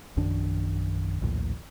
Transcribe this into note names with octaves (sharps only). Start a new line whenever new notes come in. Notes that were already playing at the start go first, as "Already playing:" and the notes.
A#1 F#2 D#3 D4
A#1 D#2 A2